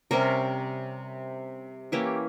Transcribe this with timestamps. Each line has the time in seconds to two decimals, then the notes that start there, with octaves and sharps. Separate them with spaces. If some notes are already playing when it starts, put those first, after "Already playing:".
0.11 C3 G3 C#4 A#4
1.92 E3 A#3 C#4 E4 G4